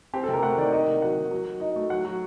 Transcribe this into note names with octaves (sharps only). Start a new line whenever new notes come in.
C4 G4
A4
C3
A#4
A3 F#5
D#3 D5
A#3 D#5
C3
F#3 F#5
D#3
F#3
F#3
D#4 D#5
A3
F#3 F#5
F#3